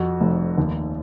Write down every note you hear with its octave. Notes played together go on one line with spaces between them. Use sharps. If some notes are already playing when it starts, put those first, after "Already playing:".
Already playing: F2 F#4
F1
D#2